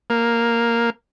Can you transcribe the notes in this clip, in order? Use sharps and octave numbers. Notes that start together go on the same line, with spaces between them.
A#3